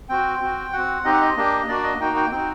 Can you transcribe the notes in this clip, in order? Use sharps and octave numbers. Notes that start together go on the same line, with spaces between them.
C4 F#4 G5
C4 F#4
C4 F#4 F#5
C4 D#4 G4 D#5
F#5
D#5
A#3 D4 G4
A#3 D4 F#4 D5
D#5
A#3 D#4 F#4 G5
G5
C4 D#4 F#4 G5